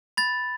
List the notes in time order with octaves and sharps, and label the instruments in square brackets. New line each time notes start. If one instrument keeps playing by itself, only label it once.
[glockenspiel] B5 A6